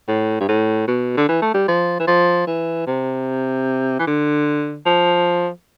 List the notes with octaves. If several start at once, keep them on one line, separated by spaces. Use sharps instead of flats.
A2
G2
A2
B2
D3
E3
A3
G3
F3
E3
F3
E3
C3
E3
D3
F3